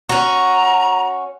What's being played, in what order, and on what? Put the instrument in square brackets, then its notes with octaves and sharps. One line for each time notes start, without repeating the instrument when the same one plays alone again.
[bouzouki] C#4 F#4 [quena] A#5